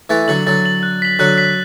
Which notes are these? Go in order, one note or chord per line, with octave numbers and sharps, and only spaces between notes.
E3 A3 A6
D3 F#3 F#7
D3 F#3 A6
F#7
F#6
B6 F#7
D3 F#3 F#6
B6 F#7